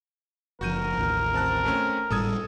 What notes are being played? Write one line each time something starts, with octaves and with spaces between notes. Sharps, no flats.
F#1 F3 F#4 A#4 G6 D#7
A1 D#2
C4 A5 F#6
A3 C4 C#4
G#1 A2 G3 A4 D#6 G#6